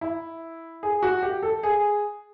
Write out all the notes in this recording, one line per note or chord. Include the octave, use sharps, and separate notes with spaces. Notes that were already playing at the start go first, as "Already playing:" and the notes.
E4
G#4
F#4
G4
A4
G#4